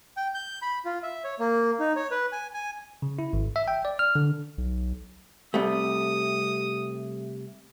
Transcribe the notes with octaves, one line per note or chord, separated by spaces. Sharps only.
G5
G6
B5
F4
E5
C#5
A#3
D#4
C#5
B4
G#5
G#5
C#3
E4
G#1
E5
G5
D5
F6
D3
B1
C3 G3 A3 D#6